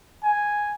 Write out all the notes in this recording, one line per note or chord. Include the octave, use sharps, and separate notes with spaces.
G#5